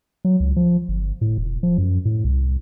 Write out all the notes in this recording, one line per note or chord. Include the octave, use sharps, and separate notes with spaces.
F#3
C#2
F3
G1
A2
E1
F3
F#2
A2
C2